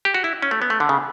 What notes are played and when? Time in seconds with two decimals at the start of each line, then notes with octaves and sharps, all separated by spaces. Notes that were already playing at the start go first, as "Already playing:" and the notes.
0.05 G4
0.14 F#4
0.24 E4
0.42 C#4
0.51 A3
0.62 B3
0.70 A3
0.80 D3
0.89 C#3